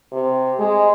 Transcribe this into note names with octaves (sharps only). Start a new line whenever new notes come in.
C3
G#3